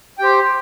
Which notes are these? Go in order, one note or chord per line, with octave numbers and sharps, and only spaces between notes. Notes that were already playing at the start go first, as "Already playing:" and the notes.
G4 C5 G5